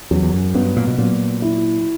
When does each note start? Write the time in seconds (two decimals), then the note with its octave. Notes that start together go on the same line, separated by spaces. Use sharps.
0.11 E2 F#3
0.22 E2
0.33 F#2
0.54 G2 B3
0.77 A#2
0.87 B2
0.98 A#2 F#3
1.42 E4